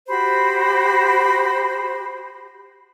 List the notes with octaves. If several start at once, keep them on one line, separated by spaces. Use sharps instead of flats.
F#4 G4 C5 B5